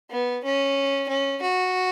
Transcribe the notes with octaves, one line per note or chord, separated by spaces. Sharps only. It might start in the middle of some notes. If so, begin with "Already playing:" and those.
B3
C#4
C#4
F#4